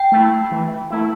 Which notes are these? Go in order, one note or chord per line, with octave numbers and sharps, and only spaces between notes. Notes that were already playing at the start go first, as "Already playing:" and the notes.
Already playing: G5
A3 E4
E3
A3 E4